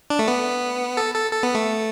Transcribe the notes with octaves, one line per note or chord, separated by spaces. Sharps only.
D4
A3
B3
A4
A4
A4
B3
A3